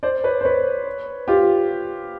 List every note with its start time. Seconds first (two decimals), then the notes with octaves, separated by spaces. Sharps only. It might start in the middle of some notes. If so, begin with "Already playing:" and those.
0.03 C5 D5
0.24 B4 C#5
0.41 C5
0.45 B4 C#5
1.28 F4 G4